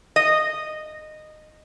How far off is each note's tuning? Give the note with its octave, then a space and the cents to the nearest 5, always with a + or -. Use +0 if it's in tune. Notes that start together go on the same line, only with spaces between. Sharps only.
D#5 -15